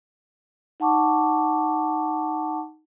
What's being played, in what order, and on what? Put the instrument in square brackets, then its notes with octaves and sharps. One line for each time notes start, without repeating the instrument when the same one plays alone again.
[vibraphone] D#4 F#5 A5 C#6 D6